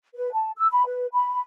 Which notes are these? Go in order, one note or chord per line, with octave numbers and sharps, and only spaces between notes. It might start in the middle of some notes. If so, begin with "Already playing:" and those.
B4
A5
E6
B5
B4
B5